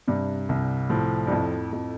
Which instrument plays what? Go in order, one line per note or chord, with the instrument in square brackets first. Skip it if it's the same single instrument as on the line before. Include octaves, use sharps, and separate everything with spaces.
[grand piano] G2 [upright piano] C3
[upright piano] C2
[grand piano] A2 [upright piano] F3
[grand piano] G2
[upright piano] F2 [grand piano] A2
[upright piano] F2